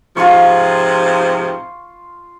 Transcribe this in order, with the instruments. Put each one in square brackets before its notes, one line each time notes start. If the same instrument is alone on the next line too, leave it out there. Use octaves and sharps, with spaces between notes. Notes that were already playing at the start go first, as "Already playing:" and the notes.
[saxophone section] G#2 C3 F3 [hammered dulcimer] F4 C#6